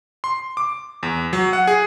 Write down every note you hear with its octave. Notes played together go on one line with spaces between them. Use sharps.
C6
D6
E2
F#3
F#5
G#4